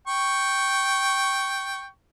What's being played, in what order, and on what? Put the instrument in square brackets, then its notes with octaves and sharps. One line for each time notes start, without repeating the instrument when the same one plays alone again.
[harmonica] G5 C#6